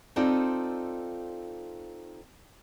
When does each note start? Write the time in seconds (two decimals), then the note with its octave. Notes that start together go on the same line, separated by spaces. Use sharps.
0.16 C4 D#4 F4 A4 C5 D5